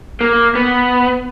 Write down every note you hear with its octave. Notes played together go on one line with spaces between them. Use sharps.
A#3
B3